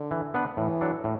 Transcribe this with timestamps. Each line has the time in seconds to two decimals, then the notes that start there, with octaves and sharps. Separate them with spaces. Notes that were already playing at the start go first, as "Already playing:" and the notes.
Already playing: D3
0.11 E3
0.34 B3 D4 B4
0.57 A2 E3
0.81 F#3 D4 A4
1.04 A2